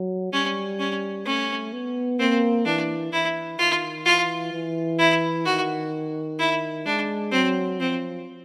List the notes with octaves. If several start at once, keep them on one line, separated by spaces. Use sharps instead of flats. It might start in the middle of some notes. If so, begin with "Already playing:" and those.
Already playing: F#3
G3 C#4
C#4
A3 C#4
B3
A#3 C4
E3 D4
E3 E4
D#3 F4
E3 F4
E3
E4
D#3 F#4
E4
G#3 D4
F#3 C4
F3 C4